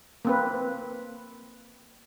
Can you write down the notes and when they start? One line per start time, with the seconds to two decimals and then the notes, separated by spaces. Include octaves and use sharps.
0.25 A#3 C4 B4